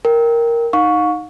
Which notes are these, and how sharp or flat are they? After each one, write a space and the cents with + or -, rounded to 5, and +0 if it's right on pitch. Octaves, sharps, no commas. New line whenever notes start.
A#4 +0 G5 +0
D#4 +0 F5 +45 C#6 +10